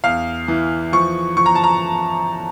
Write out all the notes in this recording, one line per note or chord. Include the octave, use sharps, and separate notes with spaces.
E2 F5
E3
F3 C#6
F3 C#6
A#5
A5
A#5